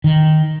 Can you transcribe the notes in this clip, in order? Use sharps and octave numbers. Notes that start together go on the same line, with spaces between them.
D#3